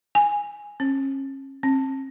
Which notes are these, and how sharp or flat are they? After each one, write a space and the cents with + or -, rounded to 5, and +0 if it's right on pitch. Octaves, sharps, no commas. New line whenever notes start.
G#5 -10
C#4 -35
C4 +45